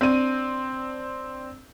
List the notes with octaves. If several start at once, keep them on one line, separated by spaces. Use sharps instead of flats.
C4 D4 D#7